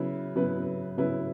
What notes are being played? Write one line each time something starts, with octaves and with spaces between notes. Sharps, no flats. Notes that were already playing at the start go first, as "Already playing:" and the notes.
Already playing: C#3 F#3 B3 E4 B4
C#3 F#3 B3 E4 B4
C#3 F#3 B3 E4 B4